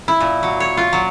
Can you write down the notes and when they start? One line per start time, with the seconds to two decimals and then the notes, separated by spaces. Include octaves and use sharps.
0.08 E4
0.20 A#2
0.43 F#3
0.60 C#5
0.77 F4
0.93 F#3